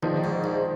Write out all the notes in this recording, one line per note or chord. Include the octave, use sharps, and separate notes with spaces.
A#1 D#3 F3
G#2
A#1